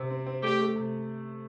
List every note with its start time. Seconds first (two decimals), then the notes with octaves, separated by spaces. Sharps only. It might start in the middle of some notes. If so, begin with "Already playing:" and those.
Already playing: C3 C4
0.11 C4
0.26 C4
0.42 A3 G4
0.59 A3
0.76 C3